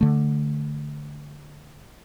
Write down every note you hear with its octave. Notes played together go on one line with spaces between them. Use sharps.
D3 A3